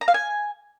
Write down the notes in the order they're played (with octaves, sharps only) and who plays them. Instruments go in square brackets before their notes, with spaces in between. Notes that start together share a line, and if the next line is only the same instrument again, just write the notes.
[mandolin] A#5
F5
G#5